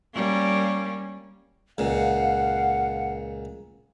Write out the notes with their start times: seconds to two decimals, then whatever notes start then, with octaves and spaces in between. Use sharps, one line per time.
0.14 G3 A#3 C#4
1.78 C#2 A#2 F5 F#5